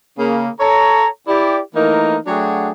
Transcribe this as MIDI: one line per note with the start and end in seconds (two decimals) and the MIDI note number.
0.18 0.49 49
0.18 0.49 58
0.59 1.07 69
0.59 1.07 73
0.59 1.07 82
1.27 1.59 64
1.27 1.59 67
1.27 1.59 74
1.74 2.17 52
1.74 2.17 57
1.74 2.17 58
1.74 2.17 63
1.74 2.17 70
2.27 2.70 54
2.27 2.70 57
2.27 2.70 62
2.27 2.70 66
2.27 2.70 68
2.27 2.70 79